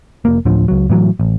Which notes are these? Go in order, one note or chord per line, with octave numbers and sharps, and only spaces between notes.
F1 A#3
D2 A2 D3 F3
C#2 F#3
A2 E3 F#3
A1